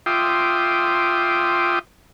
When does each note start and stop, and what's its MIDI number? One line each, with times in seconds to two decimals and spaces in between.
0.06 1.79 65
0.06 1.79 76
0.06 1.79 79
0.06 1.79 84
0.06 1.79 86
0.06 1.79 87